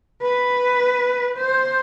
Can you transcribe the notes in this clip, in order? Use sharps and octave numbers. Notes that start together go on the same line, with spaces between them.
B4
C5